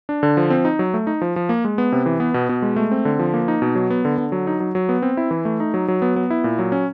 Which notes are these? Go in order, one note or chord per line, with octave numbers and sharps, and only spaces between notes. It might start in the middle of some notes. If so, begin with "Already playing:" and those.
D4
D3
F3
C4
D#4
F#3
A3
D#4
F3
F3
A#3
G#3
B3
C3
E3
B3
B2
B2
G#3
A3
C4
D3
F3
A#3
D#4
B2
F#3
B3
D3
D3
F#3
D#4
F#3
F#3
B3
C4
E4
E3
A3
D#4
F#3
F#3
B3
B3
E4
A#2
F#3
C#4